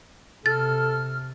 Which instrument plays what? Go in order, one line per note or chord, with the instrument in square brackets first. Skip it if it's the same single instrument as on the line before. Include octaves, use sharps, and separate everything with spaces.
[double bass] C3 [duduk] A4 [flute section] F6 [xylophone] A6